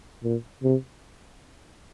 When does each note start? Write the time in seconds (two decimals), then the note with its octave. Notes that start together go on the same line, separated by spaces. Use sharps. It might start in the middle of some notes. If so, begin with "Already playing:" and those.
0.24 A#2
0.63 C3